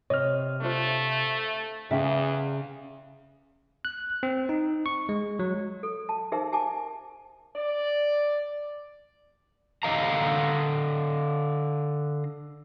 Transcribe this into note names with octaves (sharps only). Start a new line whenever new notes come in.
C3 C#5 D#5 F6
A3 D4 F4 C5
E2 C#3 G#4 E5 G5
F#6
C4
D#4
C#6
G#3
F#3
A4
A5
D#4 G4 G#4 A#4 C5 E5
G4 G#5 A5 D6
D5
D3 D#5 F5 A#5